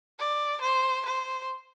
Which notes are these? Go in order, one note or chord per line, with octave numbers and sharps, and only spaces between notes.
D5
C5
C5